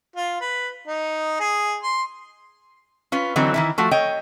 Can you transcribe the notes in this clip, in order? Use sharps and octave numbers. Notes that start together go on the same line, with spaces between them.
F4
B4
D#4
G#4
C6
C#4 F4 B4
D3 E3 F#3 C4 D#4
D#3 E3 E4
F3 A3 F#4
C#5 D#5 G5